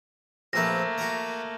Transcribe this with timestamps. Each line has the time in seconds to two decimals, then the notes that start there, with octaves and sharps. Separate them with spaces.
0.53 A#1 A3 A#3 C4 B4 A#6
0.98 F#4 A#4